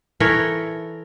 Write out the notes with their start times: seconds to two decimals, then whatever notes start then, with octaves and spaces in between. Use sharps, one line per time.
0.20 E3 A4 A#4 C#5